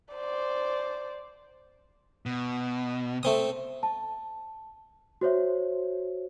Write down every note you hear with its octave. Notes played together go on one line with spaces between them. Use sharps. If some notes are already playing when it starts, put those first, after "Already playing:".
C5 D5
B2
A3 C4 D#6
A5
F#4 C5 C#5 E5